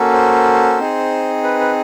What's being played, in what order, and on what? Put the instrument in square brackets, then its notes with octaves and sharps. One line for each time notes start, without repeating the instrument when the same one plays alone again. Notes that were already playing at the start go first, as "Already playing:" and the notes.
Already playing: [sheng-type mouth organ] A#3 C#4 F#4 A4
C5
C4 D#4 G#4
B4
B4